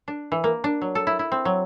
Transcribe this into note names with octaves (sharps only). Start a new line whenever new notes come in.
D4
E3
A#3
D4
F#3
A4
E4
E4
C4
F#3